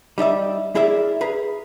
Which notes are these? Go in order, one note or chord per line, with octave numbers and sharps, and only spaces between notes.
G3 D#4 D5 E5
E4 G#4 A#4 D5 E5
G#4 B4 A#5